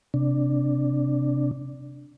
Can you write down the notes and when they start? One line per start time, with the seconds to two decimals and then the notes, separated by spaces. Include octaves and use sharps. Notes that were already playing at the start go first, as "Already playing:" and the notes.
0.14 C3 D4